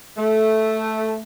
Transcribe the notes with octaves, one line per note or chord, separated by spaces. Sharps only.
A3